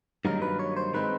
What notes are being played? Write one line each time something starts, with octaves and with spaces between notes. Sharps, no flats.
G2 D#3 F#3 A#3 D#4 A#4
B4
C#5
C5
D#3 G#3 C4 D#4 B4